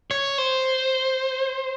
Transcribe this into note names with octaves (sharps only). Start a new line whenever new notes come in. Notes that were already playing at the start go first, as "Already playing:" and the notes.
C#5
C5